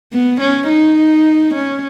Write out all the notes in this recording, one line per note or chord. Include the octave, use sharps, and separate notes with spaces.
B3
C#4
D#4
C#4